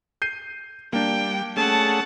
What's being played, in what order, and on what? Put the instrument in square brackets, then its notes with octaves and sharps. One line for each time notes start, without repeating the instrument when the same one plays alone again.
[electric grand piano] G6 C7 D#7
[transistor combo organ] G3 [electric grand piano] A#3 D4 [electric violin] G5
[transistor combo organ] A3 C#4 G#4 [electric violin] F#5 A5